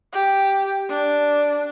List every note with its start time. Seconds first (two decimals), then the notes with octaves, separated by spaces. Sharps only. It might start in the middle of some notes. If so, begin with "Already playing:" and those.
0.13 G4
0.90 D4